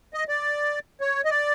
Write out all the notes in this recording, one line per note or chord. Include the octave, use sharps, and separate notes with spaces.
D#5
D5
C#5
D#5
D5